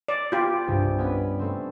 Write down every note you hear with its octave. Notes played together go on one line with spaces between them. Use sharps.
D5
B3 F4 G4
C2 G2
B3 C#4 B4
A3 C4